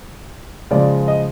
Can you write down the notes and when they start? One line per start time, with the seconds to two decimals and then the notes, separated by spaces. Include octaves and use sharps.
0.71 C#3 F3 G#3 D5
1.08 D#5